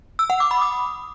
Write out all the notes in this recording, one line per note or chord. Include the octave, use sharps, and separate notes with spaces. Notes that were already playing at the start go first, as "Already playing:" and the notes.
E6
F#5
D6
B5
D#6